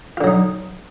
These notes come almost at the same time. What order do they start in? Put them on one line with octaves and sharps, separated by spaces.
F4 D3 F#3 D#4